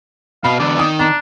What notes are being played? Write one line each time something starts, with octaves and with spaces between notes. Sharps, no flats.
B2 F5 B5
E2 D3 D5
D#3 D#6
D4 A#5